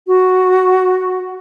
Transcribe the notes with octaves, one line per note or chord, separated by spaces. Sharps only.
F#4